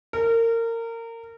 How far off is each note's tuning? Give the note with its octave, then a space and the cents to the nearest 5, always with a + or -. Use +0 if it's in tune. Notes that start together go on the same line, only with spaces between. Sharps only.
A#4 -25